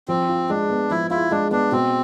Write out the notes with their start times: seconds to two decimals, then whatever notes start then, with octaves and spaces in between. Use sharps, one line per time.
0.08 F3 C4
0.29 F4
0.49 G#3 D4
0.70 B3
0.91 F3 E4
1.10 E4 F4
1.31 G#3 D4
1.51 B3 D4
1.72 B2 C4